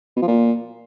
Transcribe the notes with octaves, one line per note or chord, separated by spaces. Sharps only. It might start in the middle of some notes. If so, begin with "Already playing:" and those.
B2
F3
A#2